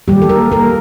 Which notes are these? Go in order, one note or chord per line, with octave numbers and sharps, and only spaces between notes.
D#3 G3 A#3 G4
A4
A#3 A#4
A#3 A#4